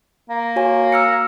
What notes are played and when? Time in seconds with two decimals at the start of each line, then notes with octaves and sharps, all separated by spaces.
0.30 A#3
0.56 F#4 C#5 G#5
0.92 E6 F6 C#7